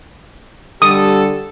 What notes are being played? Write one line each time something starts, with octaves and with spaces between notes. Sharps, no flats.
D3 G3 G4 A4 D#6